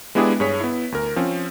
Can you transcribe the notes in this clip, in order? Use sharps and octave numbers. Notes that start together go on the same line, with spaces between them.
G#3 B3 D4 E4 G4 G#4
G2 G#4 C#5 B6
B3 E4
D2 A#4
F3 C4 C#4